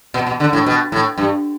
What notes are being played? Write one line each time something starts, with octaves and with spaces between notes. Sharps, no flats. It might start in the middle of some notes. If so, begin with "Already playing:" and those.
B2
B2
D3
A2
B2
A2
G2